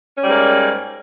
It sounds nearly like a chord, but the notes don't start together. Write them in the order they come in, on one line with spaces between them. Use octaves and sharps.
C#4 G3 G#2 A#3